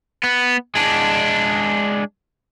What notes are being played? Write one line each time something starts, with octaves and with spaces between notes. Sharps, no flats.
B3
G#3 D4